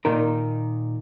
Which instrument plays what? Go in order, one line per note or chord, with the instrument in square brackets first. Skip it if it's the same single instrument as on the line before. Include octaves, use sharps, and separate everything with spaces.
[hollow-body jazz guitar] A#2 D#3 D#4 A#4